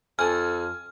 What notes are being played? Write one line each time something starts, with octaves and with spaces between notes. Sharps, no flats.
F2 A4 G#5 F6